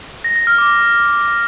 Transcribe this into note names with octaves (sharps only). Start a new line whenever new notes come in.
A#6
A#6
F6
D6